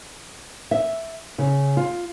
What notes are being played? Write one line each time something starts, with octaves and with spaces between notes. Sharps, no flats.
E5
C#3
F4